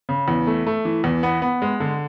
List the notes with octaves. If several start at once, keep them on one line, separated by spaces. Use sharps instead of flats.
C#3
E2
A3
A3
E3
E2
B3
B3
G#3
D3